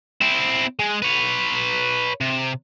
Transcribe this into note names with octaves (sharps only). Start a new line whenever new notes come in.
C4 E4
G#3
B4 C#5
C3